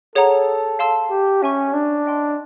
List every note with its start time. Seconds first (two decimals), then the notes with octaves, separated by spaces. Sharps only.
0.15 G#4 A4 C#5 F#5 A#5
0.79 F5 A5 C6 E6
1.10 G4
1.42 C#4 E5 G#5 C#6
1.73 D4
2.06 D#5 G5 C6